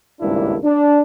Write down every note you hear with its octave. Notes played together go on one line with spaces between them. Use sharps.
G#1 C#2 G2 A#3 D4 E4
D4